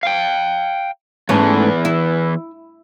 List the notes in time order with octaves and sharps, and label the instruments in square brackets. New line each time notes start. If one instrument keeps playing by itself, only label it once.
[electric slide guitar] F5 G5
[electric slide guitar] E2 E3 [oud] G#2 A3 C#4
[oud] E4